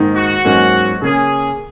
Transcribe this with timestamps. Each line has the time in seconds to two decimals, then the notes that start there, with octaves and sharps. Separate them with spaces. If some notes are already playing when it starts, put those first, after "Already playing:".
Already playing: G#2 D#3 A#3 D#4
0.16 F#4
0.45 G#2 F#3 A#3 C#4
1.02 C#3 A#3 C#4 G#4